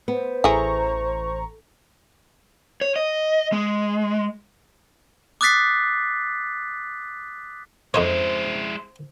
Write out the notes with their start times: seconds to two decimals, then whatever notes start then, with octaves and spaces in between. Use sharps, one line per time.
0.08 B3 C5
0.44 A1 E4 G#4 A4 A#5 C#6
2.81 C#5
2.96 D#5
3.53 G#3
5.41 D6 D#6 F#6 A6 B6 C7
7.94 F2 G#3 C4 D#4 E4 C#5